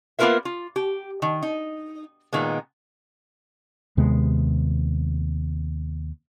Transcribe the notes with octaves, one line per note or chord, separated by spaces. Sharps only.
A#3 B3 F4 A#4 B4 E5
F4
G4
D#3
D#4
A#2 D#3 G#3 B3
D#2 C3 G#3 B3